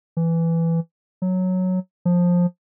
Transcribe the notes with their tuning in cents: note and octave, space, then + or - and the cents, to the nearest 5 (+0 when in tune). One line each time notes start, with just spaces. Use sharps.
E3 +10
F#3 -5
F3 +15